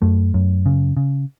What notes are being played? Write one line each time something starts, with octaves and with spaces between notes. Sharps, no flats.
F#2 A3
F#2
C#3
C#3